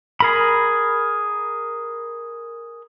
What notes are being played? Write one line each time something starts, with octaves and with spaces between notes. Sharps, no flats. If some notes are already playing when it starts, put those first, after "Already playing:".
G#4 A#4 B5